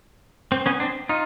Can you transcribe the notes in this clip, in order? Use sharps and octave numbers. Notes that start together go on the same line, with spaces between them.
C4
B3 C#4
C4 D4
D#4 F4